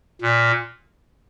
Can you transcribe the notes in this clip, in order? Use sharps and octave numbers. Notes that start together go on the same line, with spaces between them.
A#2